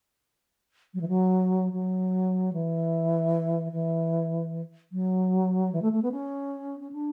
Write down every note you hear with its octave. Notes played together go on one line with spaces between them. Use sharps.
F#3
E3
F#3
F#3
E3
E3
F#3
E3
A3
A3
B3
C#4
C#4
D4